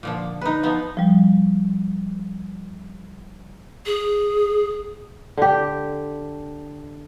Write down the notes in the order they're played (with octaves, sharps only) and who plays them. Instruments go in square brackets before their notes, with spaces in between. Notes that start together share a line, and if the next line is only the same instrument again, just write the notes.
[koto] A#2 D3 F3
D#4 B4
F3 B3 D#4
[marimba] F3 G3
[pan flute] G#4
[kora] D3 G4